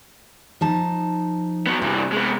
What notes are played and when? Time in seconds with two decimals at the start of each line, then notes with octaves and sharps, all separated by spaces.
0.61 F3 D#4 A5
1.66 F#3 B3
1.82 G2 C3 E3
2.12 G#3 B3